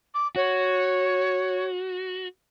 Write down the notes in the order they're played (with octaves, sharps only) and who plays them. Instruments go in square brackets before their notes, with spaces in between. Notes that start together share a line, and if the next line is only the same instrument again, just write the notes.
[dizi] D6
[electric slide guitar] F#4 [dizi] C#5